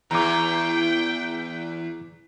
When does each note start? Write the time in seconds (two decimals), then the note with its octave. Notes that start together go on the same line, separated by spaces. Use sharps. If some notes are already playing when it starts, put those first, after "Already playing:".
0.11 E2 G5 A#5 D6